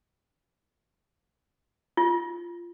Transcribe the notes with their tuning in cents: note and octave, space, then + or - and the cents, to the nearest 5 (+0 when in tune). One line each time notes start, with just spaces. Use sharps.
F4 -15